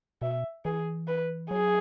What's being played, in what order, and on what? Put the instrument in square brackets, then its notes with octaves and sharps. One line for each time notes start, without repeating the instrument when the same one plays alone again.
[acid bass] B2 [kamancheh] E5
[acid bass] E3 [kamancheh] G#4
[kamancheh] B4
[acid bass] F#3 [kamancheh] G#4